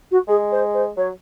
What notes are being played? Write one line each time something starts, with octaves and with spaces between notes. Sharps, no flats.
F#4
G#3 G#4
C5
C5
F#3 C#5